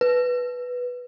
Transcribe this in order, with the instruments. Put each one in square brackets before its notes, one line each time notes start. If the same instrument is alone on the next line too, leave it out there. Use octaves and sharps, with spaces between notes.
[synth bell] B4